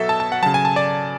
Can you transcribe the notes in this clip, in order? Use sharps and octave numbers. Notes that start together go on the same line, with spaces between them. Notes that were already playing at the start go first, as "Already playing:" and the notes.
Already playing: B2 F#3 A4 E5
A5
A5
F#5
C#3 F#3 A5
G#5
A5
D5